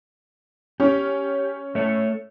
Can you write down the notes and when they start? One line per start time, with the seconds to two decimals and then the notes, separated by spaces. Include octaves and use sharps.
0.80 C#4 G4
1.75 A3 C#5